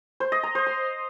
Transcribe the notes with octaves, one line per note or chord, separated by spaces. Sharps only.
C5
D#5
A#5
C5
C6